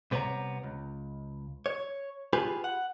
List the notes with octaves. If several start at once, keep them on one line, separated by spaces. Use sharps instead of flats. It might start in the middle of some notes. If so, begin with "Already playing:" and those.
C2 C3 B3 D4 C#5 A#5
C#2
C#5
F4 G4 G#4 B4
F#5